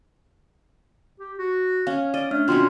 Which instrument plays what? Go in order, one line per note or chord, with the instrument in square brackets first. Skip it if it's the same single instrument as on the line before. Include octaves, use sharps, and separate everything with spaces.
[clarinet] G4
F#4
[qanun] C#4 [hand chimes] F5
[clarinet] D5 [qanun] D#5
[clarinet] A3 [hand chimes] D4 F6
[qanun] B2 F#3 C#4 [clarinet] C4 [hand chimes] F4 C6